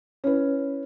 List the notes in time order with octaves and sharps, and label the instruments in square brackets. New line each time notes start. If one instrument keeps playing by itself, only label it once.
[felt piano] C#4 E4 B4